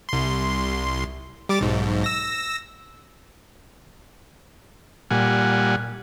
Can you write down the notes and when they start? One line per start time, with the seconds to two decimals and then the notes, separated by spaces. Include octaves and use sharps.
0.09 C2 C6
1.49 G3 D6 A6
1.61 B1 G#2
2.04 E6 A#6
5.11 A#2 G3 F#5 G#5